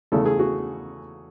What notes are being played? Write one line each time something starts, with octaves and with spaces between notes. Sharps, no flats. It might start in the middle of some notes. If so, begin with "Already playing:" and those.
E2 C#3 E3 A3 A4
G#4
F#4